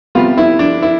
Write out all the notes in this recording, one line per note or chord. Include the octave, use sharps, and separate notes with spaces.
C3 G3 B3 F4
E4
D4
E4